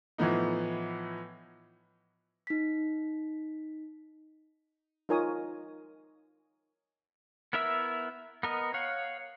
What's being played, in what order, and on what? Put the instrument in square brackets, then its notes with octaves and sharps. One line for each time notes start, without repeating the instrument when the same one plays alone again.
[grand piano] A2 E3 F3 B3 D#4
[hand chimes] D#4 B6
[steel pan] D#4 F4 A#4 C#5 G#5 D#6
[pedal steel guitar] B3 E4 A#4 E5 E6
B3 A#4 D#5
C#5 F5 F#5